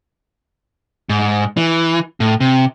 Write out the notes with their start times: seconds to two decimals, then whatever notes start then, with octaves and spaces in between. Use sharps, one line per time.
1.09 G#2
1.57 E3
2.20 A2
2.41 C3